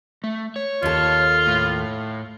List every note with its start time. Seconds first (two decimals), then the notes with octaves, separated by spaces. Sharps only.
0.24 A3
0.56 C#5
0.83 D#2 F4 A4
1.47 A2